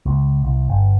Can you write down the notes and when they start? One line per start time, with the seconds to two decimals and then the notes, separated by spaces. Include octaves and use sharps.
0.06 C#2
0.44 C2
0.69 G1